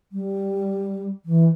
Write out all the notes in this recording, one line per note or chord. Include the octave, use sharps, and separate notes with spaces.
G3
E3